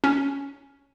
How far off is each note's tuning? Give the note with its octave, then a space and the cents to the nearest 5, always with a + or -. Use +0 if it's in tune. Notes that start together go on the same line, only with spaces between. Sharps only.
C#4 +10